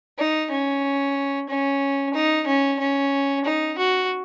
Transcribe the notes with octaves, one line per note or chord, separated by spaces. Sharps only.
D#4
C#4
C#4
D#4
C#4
C#4
D#4
F#4